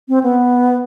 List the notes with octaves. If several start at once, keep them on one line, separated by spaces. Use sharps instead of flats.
C4
B3